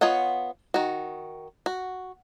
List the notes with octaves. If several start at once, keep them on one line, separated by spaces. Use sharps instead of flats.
B3 F4 C#5 D#5 F#5
D#3 F#4
F#4